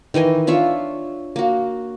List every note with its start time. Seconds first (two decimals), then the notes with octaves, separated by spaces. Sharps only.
0.14 D#3 E3 D#5 G#5
0.47 D4 F4 C#5 E5
1.36 A#3 F#4